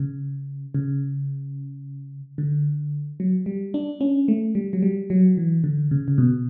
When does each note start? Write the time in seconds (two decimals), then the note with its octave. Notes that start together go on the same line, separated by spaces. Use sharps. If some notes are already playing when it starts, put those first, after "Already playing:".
Already playing: C#3
0.74 C#3
2.38 D3
3.20 F#3
3.46 G3
3.74 D4
4.01 C#4
4.28 A3
4.55 G3
4.73 F#3
4.83 G3
5.10 F#3
5.37 E3
5.64 D3
5.91 C#3
6.08 C#3
6.18 B2